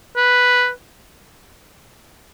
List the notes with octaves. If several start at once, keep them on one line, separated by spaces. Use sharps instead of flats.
B4